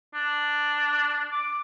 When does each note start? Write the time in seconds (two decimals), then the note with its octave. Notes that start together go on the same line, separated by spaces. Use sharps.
0.14 D4
1.32 D6